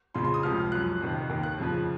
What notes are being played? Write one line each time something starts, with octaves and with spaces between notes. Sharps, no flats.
F2 C#3 F3 C6
C6
D#6
C#2 C3 F3 F6
F#2 F3 F#6
F2 C3 D#3
D#2 D#3
F#6
F2 C#3 F3